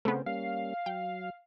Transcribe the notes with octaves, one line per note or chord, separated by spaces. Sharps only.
C#3 A3 B3 C4 C5
G3 A#3 C#4 F5
F#3 G5